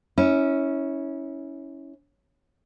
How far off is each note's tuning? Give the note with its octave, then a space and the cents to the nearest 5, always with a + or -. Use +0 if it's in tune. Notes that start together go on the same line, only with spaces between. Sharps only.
C#4 +0 E4 -30